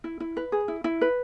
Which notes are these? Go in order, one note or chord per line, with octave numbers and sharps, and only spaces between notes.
E4
E4
B4
G#4
E4
E4
B4